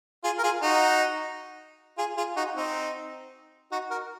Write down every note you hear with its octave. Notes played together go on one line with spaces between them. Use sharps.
F4 G#4
A#4
F4 G#4
D#4 F#4
F4 G#4
F4 G#4
D#4 F#4
C4 D#4
D#4 F#4
F#4 A#4